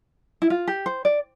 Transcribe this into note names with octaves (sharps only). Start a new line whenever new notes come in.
E4
F4
G4
C5
D5